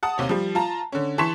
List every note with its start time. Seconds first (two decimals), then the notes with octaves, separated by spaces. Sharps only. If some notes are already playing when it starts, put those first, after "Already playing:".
0.03 F#5 A5 D#6
0.18 D#2 C3 C#5
0.29 F3 G3
0.55 F4 A5 A#5
0.92 D3 C#4
1.18 E3 A5 C6 C#6 B6 E7